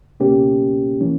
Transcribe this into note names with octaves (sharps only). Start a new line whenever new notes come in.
C#2 B2 A#3 C#4 G4
E3 A#3 C#4